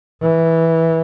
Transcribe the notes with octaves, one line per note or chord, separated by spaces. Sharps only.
E3